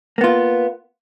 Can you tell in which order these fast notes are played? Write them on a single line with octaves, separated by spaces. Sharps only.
A#3 B3 F4